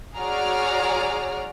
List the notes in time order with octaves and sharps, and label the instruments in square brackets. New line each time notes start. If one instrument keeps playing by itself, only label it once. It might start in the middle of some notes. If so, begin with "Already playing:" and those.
[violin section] F#4 G#4 C#5 D5 A#5 F6